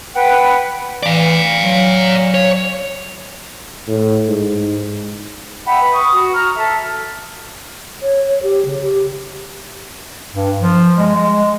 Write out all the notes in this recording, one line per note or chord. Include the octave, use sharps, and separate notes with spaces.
B4 F#5 G5
E3 D5 F5
F#3
C#5
A2
G#2
E5 F#5 G5 B5
B4
C#6 D#6
F#4
A#5 F6
A4 E5
C#5
G4
C#3
G4
G2
F3
G#3
G#3